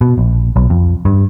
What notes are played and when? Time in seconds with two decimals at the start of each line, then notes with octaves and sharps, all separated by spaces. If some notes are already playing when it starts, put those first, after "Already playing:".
0.01 B2
0.18 A#1
0.56 B1
0.70 F2
1.05 G2